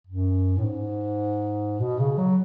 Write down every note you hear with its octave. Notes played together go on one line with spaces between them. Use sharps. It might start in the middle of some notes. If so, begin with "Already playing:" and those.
F#2
A2
G#2
B2
C#3
F#3